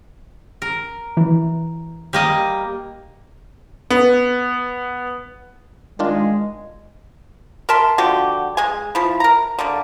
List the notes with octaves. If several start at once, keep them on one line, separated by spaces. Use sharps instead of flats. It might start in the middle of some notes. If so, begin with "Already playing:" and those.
A#4
E3
G3 A#3 D#5
B3
D#3 G#3 D4 F4
A#4 E5 A5 C6
D3 F3 F#4 G4
G#3 G#5
F3 E4
A#4 A#5
D3 G3 A#3